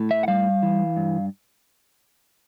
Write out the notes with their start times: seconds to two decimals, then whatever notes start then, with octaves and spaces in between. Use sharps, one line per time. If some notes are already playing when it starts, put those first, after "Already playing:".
Already playing: A2
0.11 E5
0.23 F#5
0.28 G3 F5
0.63 E3
0.97 G2